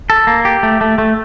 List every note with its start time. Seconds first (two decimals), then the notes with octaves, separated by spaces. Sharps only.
0.10 A4
0.27 A#3
0.45 G4
0.63 A3
0.81 A3
0.98 A3